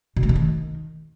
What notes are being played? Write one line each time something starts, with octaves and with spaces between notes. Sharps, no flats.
B2
A3
D3
D#3